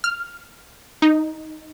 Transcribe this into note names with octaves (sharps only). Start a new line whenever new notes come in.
F6
D#4